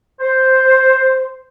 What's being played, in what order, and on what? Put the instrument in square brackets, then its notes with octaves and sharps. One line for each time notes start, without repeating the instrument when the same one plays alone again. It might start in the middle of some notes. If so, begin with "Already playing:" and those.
[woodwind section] C5